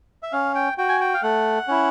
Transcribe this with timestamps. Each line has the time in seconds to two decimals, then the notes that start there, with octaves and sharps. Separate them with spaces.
0.23 E5
0.32 C#4 F5
0.55 G5
0.78 F#4 G5
0.89 G#5
1.01 G5
1.14 F5
1.23 A3 F#5
1.68 C#4 E4